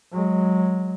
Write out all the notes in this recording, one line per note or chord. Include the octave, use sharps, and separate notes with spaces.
F#3 G#3